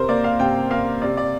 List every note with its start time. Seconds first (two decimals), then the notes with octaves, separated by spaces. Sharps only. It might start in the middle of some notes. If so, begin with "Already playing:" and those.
Already playing: C3 A#4 C5
0.09 A#3 D5
0.24 F5
0.39 C3 G5
0.71 A#3 F5
1.02 C3 D5
1.17 D5